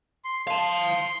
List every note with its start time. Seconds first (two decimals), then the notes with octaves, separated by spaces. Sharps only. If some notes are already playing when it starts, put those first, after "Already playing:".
0.25 C6
0.47 F5 A5 C6